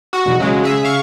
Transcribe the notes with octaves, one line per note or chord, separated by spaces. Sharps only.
F#4
B1 E2 B2
C#3 F#3 G#3
G#4 E5
F5 C#6